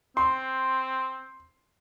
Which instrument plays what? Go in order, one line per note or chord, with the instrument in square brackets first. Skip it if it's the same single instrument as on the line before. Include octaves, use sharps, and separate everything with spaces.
[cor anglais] C4 [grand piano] C6